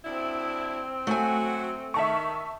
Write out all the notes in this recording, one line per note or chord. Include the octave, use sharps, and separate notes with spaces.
D2 C4 D4 E4
F#3 A3 F#4 G#5
D#3 E5 A5 C#6